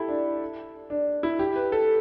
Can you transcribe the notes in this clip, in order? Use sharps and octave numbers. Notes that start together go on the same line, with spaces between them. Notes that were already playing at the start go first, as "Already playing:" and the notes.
Already playing: E4 G4 A4
D4
D4
E4
G4
B4
A4